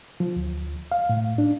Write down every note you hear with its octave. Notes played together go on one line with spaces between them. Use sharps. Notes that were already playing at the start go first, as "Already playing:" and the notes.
F3
D2
F5
A2
D4